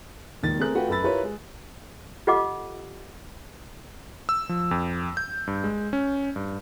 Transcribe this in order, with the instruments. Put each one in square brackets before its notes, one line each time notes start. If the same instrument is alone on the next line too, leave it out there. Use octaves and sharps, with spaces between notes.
[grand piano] E1 D#2 D#3 A6
A3 C4 G#4 A#4 F#6
A3 F4 F#4 B4 F#5 G5
F#2 A4 B4 B5 E6 A6
E4 F4 G4 A#4 B4 C#5
G#3
[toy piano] F4 G4 A4 D#5 F#5 D6
[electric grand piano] E6
F3
F2
G6
G2
G#3
C#4
G2